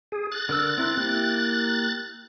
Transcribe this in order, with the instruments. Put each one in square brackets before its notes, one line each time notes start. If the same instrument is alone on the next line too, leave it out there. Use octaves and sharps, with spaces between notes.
[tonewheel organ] G#4
F#6 A6
[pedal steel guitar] D3 A#4 E6
C4 E4 A#4
A#3 E4 G4